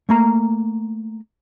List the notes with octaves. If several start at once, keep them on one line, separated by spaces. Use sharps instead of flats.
A3 A#3 A#5